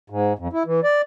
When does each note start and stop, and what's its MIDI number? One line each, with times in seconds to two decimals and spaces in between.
0.10 0.33 44
0.38 0.48 41
0.53 0.63 64
0.66 0.80 52
0.84 1.02 74